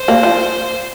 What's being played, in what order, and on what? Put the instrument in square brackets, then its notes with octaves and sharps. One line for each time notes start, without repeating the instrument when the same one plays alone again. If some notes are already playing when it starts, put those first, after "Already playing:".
Already playing: [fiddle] C5
[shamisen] A#3
F3